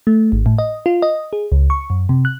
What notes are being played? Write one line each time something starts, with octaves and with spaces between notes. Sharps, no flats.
A3
G#1
A2
D#5
F4
D#5
G#4
C#2
C#6
F#2
C3
F#6